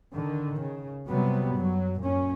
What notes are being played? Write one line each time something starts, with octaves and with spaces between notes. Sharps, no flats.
D3 D#3
C#3
C3 F#3 G3 B3
F#2 F#3
F#2 A#2 C#4